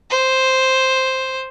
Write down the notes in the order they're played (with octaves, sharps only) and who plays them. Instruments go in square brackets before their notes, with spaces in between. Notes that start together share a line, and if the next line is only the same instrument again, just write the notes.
[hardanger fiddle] C5